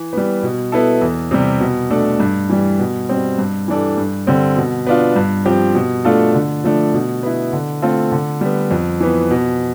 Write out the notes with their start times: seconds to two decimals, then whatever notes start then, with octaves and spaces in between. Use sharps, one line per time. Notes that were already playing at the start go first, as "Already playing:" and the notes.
Already playing: E3
0.13 G3 B3
0.43 B2
0.72 B3 E4 A4
1.02 E2
1.31 C3 G3
1.60 B2
1.90 A3 D4 A4
2.20 G2
2.49 E3 G3
2.79 B2
3.09 G3 C4
3.38 G2
3.68 E3 G3 D4 A4
3.97 G2
4.27 D3 G3 C4
4.56 B2
4.87 B3 D4 F4
5.16 G2
5.45 F3 C4 G4
5.75 B2
6.05 A3 D4 F4 A4
6.34 D3
6.64 F3 A3 D4
6.94 B2
7.23 B3 E4
7.53 D3
7.82 A3 C4 F4 A4
8.12 D3
8.41 G3 B3
8.71 F2
9.00 E3 B3
9.31 B2